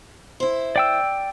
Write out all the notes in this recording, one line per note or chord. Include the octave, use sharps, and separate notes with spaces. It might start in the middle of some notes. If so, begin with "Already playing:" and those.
E4 C5
D5 G5 E6